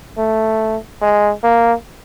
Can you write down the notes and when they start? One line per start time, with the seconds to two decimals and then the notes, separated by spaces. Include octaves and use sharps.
0.18 A3
1.02 G#3
1.43 A#3